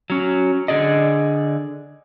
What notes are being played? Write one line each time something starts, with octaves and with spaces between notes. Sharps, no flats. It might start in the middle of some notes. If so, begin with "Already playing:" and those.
F#3 C#4
D3 G#4 D5 D#5